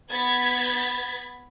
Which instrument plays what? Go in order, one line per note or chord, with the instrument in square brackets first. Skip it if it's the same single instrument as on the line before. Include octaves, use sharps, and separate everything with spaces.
[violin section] B3 B5 G#6 A6 B6